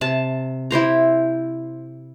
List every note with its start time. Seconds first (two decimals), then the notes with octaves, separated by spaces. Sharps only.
0.01 C3 A5
0.71 E4 G4 C5 A#5